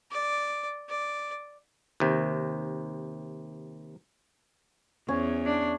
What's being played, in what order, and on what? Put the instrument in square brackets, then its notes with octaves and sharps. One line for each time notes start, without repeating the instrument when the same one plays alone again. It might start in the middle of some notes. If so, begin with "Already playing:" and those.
[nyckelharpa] D5
D5
[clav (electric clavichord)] D#2 C3
[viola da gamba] E2 [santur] C#4
[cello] D4